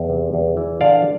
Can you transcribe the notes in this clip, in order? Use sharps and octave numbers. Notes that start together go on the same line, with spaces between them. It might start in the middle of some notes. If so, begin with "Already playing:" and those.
Already playing: E2
C3
E2
E3
D3 D5 F5